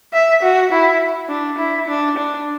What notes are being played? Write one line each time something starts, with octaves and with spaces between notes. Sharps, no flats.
E5
F#4
E4
D4
E4
D4
D4